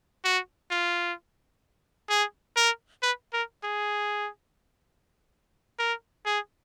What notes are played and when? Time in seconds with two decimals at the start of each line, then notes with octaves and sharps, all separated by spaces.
0.25 F#4
0.71 F4
2.10 G#4
2.57 A#4
3.02 B4
3.33 A#4
3.64 G#4
5.79 A#4
6.25 G#4